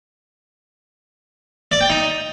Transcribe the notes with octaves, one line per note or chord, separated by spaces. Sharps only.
D5
G5
D#4